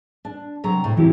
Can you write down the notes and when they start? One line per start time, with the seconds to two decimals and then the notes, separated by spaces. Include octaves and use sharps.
0.25 D4
0.64 C3 F#3 A#5
0.84 A2
0.97 E3 C4 E4 G4